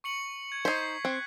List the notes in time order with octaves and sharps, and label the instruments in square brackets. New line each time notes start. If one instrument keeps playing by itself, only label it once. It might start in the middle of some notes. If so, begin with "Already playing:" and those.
[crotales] C#6 C#7 F#7
G#6
[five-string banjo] D#4 C5 [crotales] G#6 B6 C7
[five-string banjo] C4 [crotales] F#6